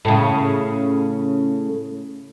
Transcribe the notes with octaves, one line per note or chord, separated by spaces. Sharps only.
A2 C#3